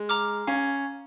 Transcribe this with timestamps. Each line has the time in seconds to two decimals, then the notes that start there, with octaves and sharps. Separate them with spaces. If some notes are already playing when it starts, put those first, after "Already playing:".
Already playing: G#3
0.09 A#5 D6 F6
0.47 C#4 F5